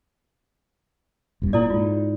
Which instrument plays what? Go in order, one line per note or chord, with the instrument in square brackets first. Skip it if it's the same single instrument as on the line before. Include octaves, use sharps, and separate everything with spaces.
[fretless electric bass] E1 G2
[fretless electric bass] A#2 [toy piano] E4 A4 D5
[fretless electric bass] G#2 [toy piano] F4